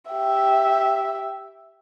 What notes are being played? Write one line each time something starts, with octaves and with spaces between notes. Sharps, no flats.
G4 E5